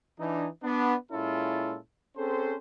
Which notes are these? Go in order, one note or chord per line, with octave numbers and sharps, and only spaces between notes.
E3 D4 D#4
B3 D4
A#2 G#3 C#4 E4 F4 A4
C4 C#4 G#4 A4 C5